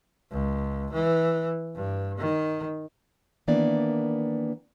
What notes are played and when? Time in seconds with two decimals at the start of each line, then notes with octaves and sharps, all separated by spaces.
0.31 C#2
0.94 E3
1.75 G2
2.18 D#3
3.48 D#3 E3 A#3 B3 D4 D5